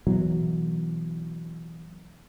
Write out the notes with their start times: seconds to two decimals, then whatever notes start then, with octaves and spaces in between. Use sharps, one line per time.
0.07 B2 E3 F#3